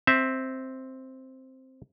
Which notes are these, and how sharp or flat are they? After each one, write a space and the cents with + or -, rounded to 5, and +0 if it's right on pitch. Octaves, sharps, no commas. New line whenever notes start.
C4 +0 E5 -10